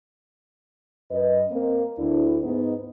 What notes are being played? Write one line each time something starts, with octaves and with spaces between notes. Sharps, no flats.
F#2 B4 D#5
A#3 C4
D2 D4 E4
G#2 B3 D#4